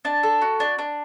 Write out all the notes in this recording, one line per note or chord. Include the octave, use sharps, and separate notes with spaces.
D4 A5
A4
F#4
D4
D4